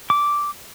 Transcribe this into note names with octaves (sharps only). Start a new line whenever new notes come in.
D6